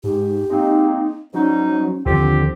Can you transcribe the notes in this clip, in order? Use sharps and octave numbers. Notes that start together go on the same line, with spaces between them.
G#2 G4
G#3 A#3 C4 D#4
G#2 F#3 G3 C#4 D#4
D#2 D3 F3 C4 F4 G4